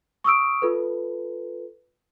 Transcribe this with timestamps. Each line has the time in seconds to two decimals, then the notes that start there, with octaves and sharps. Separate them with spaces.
0.24 C#6 D#6 E6 D7
0.62 F4 A4 B4